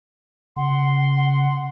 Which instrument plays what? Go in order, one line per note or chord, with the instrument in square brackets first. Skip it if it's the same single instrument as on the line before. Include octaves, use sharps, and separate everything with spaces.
[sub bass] C#3 [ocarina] F#5 [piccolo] C6
[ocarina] F#5